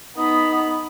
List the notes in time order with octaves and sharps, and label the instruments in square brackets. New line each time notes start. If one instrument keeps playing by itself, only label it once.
[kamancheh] B3 B5 [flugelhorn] D#4 [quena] D#6